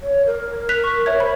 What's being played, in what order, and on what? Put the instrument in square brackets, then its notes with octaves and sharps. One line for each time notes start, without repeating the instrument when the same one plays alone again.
[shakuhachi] C#5
A#4
[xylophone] F#6 B6 F7
C#6
C#5 E5 G#6
[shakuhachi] C5 [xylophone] B5